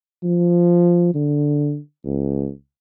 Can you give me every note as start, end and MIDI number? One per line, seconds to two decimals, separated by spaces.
0.23 1.13 53
1.14 1.78 50
2.04 2.50 37